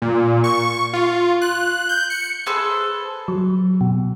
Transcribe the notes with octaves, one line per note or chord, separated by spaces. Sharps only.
A#2
C#6
F4
F#6
G6
C#7
G#4 A4 B4 C5
F#3
B2